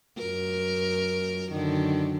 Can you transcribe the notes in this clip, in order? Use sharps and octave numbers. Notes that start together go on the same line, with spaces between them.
F#2 A#4
F#2 D3 D#3